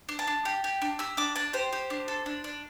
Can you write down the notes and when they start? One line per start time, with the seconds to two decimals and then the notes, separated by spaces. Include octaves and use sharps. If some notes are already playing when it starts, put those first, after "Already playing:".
0.09 D4
0.19 A5
0.27 D4
0.45 G4
0.64 G4
0.82 D4
0.99 G4 E6
1.17 D4 D6
1.36 D4 A5
1.53 G4 C5
1.73 G4
1.90 D4
2.08 A4
2.26 D4
2.44 D4